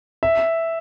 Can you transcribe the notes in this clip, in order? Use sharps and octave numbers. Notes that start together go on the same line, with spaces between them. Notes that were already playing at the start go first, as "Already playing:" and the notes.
E5